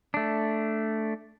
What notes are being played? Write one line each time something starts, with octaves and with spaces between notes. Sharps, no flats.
A3 D4